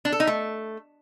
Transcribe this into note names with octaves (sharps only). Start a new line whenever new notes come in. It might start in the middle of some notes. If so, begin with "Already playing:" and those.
D4
A4
D#4
A3